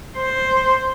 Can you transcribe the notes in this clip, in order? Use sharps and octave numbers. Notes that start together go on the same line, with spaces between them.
C5